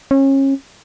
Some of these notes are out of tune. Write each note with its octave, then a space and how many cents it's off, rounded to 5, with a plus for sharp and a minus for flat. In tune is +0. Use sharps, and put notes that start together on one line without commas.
C#4 -30